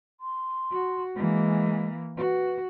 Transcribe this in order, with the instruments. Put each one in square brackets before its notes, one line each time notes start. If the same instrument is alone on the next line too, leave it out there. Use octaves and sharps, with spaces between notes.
[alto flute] C6
[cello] F#4
[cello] E3 A#3 [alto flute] G#3
[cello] F#4 [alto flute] B4